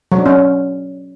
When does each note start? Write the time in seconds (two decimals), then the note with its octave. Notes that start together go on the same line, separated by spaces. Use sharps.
0.12 F#3
0.19 D4
0.26 C#4